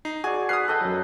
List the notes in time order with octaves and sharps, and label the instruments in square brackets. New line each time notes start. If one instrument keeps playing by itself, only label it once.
[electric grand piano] D#4 [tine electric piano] C7
[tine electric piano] F#4 D5 [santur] G#4 [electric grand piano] G#5
[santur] B4 [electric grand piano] D#6 F6 C7
[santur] A4 D#5 G5
[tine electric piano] F#2 F#3